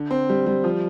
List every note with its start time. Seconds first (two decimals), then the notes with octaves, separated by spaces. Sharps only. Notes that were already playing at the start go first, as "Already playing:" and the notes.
Already playing: D3
0.11 C4
0.29 G3
0.46 G3
0.64 F3